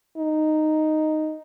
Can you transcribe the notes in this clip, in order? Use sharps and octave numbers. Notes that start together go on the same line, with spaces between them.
D#4